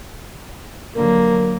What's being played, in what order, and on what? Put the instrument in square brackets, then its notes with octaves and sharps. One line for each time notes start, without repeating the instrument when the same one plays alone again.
[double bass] D3 F#3 [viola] A#3 [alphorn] A#4